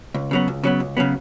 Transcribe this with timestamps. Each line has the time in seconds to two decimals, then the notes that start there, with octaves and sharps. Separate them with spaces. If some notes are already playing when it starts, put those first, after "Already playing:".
0.14 C#2
0.31 C#3 F#3 B3
0.48 C#2
0.64 C#3 F#3 B3
0.80 C#2
0.97 C#3 F#3 B3